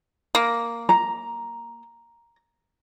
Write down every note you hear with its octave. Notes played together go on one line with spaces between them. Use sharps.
A#3
A#5